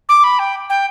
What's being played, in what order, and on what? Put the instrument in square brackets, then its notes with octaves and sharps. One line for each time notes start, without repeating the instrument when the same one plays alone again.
[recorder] D6
B5
G5
G5